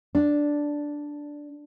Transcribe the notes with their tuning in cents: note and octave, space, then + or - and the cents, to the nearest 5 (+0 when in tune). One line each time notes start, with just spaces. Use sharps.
D4 -5